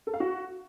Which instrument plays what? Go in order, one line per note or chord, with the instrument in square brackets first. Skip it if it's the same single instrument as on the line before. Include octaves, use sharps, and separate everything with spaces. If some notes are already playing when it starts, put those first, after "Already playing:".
[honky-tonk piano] A4
F5
F#4